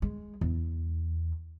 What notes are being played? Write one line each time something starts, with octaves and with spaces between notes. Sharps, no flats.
G#3
E2